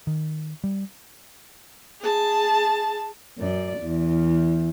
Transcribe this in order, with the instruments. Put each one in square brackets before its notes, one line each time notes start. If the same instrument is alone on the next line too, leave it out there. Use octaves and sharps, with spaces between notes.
[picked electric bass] D#3
G3
[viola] G#4 A5
[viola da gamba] F#2 D5
E2